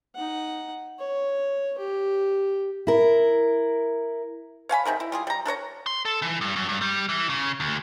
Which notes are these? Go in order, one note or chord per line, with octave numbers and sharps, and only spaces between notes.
D#4 F#5
C#5
G4
E4 A#4
C#5 F5 G#5 B5
C3 D#4 G#4 A#4
E4
G3 F4 G#4
G3 A#5
D4 A#4 C#5 A#5
C6
A4
E3
G2
F#2
G2
G3
E3
C#3
D2